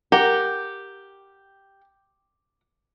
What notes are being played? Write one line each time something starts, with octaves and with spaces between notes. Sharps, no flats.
G4 A#4 F#5